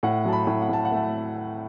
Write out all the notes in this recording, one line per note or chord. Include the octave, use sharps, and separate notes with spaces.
A2 F#5
F#3 A5
B5
A2
F#5
A2 A5
F#5
A3 A5